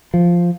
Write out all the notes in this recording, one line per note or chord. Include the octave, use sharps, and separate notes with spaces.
F3